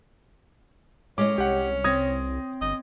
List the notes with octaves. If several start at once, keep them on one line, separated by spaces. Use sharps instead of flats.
A2 G#3 C#4 C#5 D#5 D6
C2 G4 F#5
C4 C#5 D#6 G#6 A#6
G1 D#5